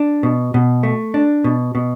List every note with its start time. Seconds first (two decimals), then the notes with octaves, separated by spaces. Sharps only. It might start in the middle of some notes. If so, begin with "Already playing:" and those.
Already playing: D4
0.23 B2
0.54 B2
0.83 A3
1.14 D4
1.44 B2
1.75 B2